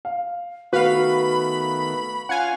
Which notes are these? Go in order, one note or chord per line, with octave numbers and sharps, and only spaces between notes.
F5
D#3 A3 B3 F#4 B4 F5 B5
C#4 F4 F5 F#5 G#5